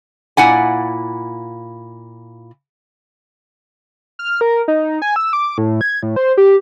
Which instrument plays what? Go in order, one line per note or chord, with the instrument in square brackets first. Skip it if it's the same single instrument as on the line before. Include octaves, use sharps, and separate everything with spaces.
[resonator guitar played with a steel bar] A#2 E4 F#5 G#5
[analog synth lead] F6
A#4
D#4
G#5
E6
D6
A2
G#6
A2
C5
G4